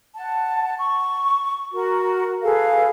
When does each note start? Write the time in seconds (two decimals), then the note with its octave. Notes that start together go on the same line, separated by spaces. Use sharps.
0.16 F#5 A5
0.77 C#6
1.73 F#4 A#4
2.42 G#4 A4 B4 F5